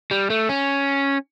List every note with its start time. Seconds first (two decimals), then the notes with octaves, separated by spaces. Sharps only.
0.11 G3
0.30 A3
0.49 C#4